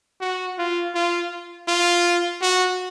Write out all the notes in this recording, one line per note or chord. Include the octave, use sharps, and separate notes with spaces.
F#4
F4
F4
F4
F#4